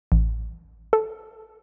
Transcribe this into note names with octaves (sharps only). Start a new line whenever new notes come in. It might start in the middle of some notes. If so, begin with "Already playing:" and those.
A1
A4